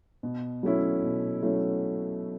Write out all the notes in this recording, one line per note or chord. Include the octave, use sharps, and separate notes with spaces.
B2
F#3 A3 C#4 E4
B2
F#3 A3 C#4 E4